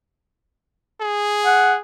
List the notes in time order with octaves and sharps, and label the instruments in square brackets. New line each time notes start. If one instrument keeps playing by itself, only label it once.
[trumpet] G#4
[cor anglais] F#5